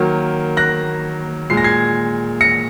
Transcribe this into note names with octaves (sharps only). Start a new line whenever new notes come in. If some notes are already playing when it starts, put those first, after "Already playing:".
Already playing: D#3 F#3 A#3
F#6 A#6
A#2 G#3 C7
A#6
G#6 C7
A#6 C#7